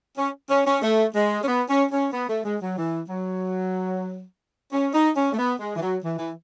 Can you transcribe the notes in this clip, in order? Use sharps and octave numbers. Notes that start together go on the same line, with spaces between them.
C#4
C#4
C#4
A3
G#3
C#4
B3
C#4
C#4
B3
A3
G#3
F#3
E3
F#3
C#4
D#4
C#4
A3
B3
G#3
E3
F#3
E3
E3